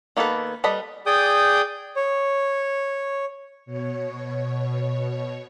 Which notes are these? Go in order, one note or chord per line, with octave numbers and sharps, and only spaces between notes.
D#3 A#3 B3 A4 B4
G3 A4 B4 D#5 B5
G#4 D5 G5 D6 D#6 G6
C#5
B2 C#5